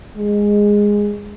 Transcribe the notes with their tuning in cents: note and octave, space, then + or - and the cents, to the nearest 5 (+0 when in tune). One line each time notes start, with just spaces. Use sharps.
G#3 -10